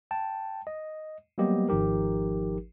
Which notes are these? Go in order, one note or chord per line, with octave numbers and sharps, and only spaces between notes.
G5 A5
D#5
F#3 G3 A#3 B3 G4 D#5
G#1 F3 D#4 G4 A#4